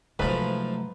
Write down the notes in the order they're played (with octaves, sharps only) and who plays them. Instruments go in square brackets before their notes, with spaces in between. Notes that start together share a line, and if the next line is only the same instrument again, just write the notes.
[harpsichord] G#2 F3 [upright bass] C3 F#3 [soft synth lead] A3 [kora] B4